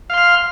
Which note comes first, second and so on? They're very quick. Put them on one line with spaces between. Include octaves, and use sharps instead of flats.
F5 C6 F6